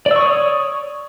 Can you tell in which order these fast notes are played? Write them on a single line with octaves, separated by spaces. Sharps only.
D5 E6 C#6 D#6 C#5